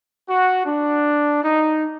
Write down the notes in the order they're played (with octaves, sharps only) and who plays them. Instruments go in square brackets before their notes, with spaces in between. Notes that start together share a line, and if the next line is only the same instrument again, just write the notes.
[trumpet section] F#4
D4
D#4